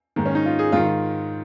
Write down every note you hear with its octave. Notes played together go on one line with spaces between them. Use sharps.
G#2 D#3 A#3
C#4
D#4
F4
G#4
G#2 D#3 F4
F4